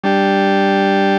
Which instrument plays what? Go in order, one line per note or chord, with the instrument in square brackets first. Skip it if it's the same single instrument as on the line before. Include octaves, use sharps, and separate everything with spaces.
[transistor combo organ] G3 D4 G4